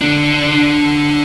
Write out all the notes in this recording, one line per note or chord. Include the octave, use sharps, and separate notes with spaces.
D3 D4